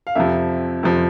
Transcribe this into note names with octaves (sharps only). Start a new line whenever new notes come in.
F5
F2 C3 F3 E5
F2 C3 F3